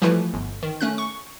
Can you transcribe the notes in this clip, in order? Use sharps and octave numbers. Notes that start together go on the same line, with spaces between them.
E3 F3 G3 A3 E4 B4
G1
D#3
A3 C#4 F#6
C#6